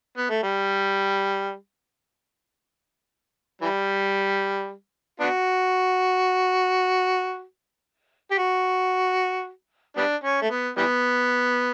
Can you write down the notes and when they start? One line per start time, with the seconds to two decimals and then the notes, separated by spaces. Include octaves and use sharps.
0.17 B3
0.30 A3
0.43 G3
3.61 E3 G3
5.20 B3 D4 F#4
8.31 G4
8.38 F#4
9.97 G3 B3 D4
10.24 C#4
10.42 A3
10.51 B3
10.77 E3 G3 B3